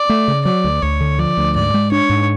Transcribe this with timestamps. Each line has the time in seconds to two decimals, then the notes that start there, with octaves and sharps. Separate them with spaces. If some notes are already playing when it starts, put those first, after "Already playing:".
Already playing: D5
0.09 A3
0.28 C#3
0.45 F#3 D5
0.64 D2
0.82 D2 C#5
1.01 D3
1.19 F3 D5
1.38 D2
1.55 G#2 D5
1.74 G#3
1.92 D4 C#5
2.10 G#2